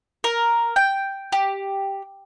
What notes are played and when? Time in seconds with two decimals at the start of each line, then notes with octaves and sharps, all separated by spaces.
0.24 A#4
0.76 G5
1.32 G4